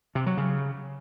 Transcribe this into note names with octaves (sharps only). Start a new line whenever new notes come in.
C3
F#3
C#3